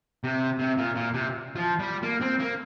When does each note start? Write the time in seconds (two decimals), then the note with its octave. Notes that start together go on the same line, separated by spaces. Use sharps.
0.24 C3
0.59 C3
0.77 A#2
0.96 A#2
1.14 C3
1.55 F3
1.79 G3
2.03 A#3
2.22 C4
2.40 A#3